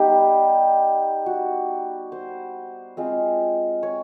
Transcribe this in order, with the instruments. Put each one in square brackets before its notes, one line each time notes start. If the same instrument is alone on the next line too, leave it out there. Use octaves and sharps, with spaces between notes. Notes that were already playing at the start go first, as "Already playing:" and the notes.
Already playing: [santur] G3 B3 D#4 G4
F#4
C5
G#3 C4 F4
C#5